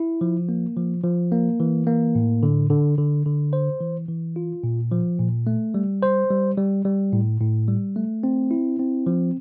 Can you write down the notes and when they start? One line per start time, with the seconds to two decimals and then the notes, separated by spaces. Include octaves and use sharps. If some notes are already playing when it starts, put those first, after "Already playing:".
Already playing: E4
0.21 F3
0.49 A#3
0.77 F3
1.04 F3
1.32 A#3
1.60 E3
1.87 A#3
2.15 A2
2.43 D3
2.70 D3
2.98 D3
3.26 D3
3.53 C5
3.81 E3
4.08 E3
4.36 F4
4.63 A#2
4.91 F3
5.19 A#2
5.47 A3
5.74 G3
6.03 C5
6.30 G3
6.58 G3
6.85 G3
7.13 A2
7.40 A2
7.68 G3
7.96 A3
8.23 C4
8.51 E4
8.79 C4
9.07 F3